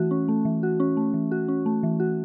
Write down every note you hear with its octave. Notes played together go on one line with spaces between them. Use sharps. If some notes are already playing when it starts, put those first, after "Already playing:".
Already playing: E3 A3 F#4
C#4
A3
E3
F#4
C#4
A3
E3
F#4
C#4
A3
E3
F#4